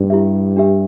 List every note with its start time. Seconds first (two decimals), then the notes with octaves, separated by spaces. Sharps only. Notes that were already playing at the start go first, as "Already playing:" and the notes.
Already playing: G2
0.10 E4 G4 E5
0.57 D4 G4 E5